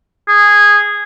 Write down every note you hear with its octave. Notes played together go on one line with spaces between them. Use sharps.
G#4